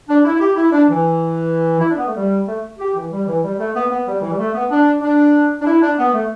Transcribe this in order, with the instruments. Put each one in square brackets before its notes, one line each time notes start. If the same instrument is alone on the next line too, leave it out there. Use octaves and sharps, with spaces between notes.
[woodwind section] D4
E4
E4
G4
E4
D4
E3
E4
D4
B3
A3
G3
A3
G4
E3
G3
E3
G3
A3
B3
B3
G3
E3
G3
A3
B3
D4
D4
D4
E4
D4
B3
A3